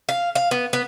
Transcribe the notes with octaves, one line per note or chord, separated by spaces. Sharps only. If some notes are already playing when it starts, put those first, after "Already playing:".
F5
F5
B3
B3